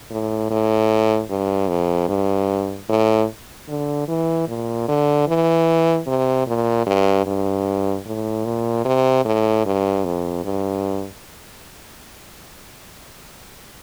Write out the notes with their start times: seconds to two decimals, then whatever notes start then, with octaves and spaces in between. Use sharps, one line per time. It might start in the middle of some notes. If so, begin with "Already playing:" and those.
0.11 A2
0.51 A2
1.30 G2
1.69 F2
2.09 G2
2.89 A2
3.69 D3
4.08 E3
4.48 A#2
4.88 D3
5.28 E3
6.07 C3
6.47 A#2
6.86 G2
7.26 G2
8.06 A2
8.45 A#2
8.85 C3
9.25 A2
9.66 G2
10.05 F2
10.45 G2